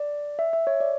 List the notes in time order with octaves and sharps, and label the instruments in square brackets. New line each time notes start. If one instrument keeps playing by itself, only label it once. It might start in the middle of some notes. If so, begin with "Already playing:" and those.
Already playing: [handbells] D5
E5
E5
C#5
D5